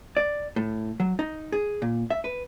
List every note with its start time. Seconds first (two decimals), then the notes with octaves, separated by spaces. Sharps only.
0.17 D5
0.56 A2
1.00 F#3
1.19 D#4
1.52 G#4
1.82 A#2
2.10 E5
2.24 B4